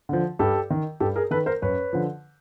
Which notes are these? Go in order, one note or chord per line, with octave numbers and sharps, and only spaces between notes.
D3 F3
G2 G4 A4
D#3
G2 G4 A4
G#4 A#4
D#3 A4 B4
A#4 C5
F#2 B4 C#5
D3 F3